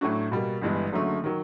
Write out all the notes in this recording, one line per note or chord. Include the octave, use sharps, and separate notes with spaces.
A2 F#3 A3 D4 F#4
B2 G3 A#3
G1 G2 E3 G#3 B3
F#1 F#2 D3 F#3 A3
D#3 F#3